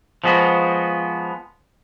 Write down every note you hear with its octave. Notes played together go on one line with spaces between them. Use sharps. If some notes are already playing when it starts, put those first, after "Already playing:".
F3 G#3 B3 F#4